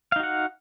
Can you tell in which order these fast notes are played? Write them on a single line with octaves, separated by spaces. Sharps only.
F5 D#4 F#4 F#5